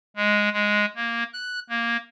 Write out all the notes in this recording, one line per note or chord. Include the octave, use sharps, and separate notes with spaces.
G#3
G#3
A#3
F#6
A#3